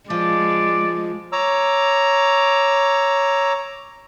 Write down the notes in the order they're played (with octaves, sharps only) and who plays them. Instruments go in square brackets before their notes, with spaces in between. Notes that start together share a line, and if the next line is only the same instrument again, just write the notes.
[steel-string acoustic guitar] F3 [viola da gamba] G#3 [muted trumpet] D5
[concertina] C#5 A#5 D6 E6